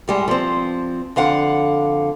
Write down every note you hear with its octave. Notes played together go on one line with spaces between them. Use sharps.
A2 G3 G#3
F3 C4
F2 D3 F5 F#5